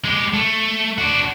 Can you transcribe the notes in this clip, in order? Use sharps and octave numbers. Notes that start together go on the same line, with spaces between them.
G#3 G4
A3
D4 F#4